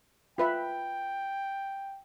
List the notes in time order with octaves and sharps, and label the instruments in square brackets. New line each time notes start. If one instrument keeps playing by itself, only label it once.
[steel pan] F4 B4 E5 [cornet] G5